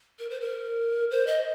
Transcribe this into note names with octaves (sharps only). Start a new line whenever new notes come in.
A#4
C5
A#4
C5
D#5